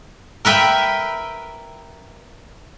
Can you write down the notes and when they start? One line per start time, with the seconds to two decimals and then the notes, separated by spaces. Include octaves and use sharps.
0.45 A#4 B4 E5 G5